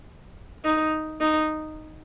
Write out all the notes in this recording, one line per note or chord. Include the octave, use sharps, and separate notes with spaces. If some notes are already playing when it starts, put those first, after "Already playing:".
D#4
D#4